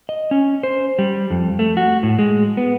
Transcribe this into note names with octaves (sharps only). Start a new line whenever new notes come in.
D#5
C#4
C5
G3
F2
A3
F#4
A2
G#3
B3